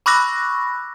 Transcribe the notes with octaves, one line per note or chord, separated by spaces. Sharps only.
B5 C#6 D6 E6 F#6 A#6